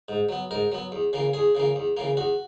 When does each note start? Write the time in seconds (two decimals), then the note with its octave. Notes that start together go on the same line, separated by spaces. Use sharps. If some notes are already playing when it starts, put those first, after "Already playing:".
0.08 G#2
0.29 F#3 B3
0.51 G#2 A#4
0.72 F#3 B3
0.92 E2
1.13 C#3 E3 A#3
1.33 E2 G#4
1.55 C#3 E3 A#3
1.76 E2
1.97 C#3 E3 A#3
2.17 E2 F#4